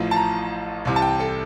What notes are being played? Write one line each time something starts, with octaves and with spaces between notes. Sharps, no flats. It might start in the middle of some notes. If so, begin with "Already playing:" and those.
Already playing: A1 A2 F3
A5
A#5
C2 C3 E3
A5
G5
A4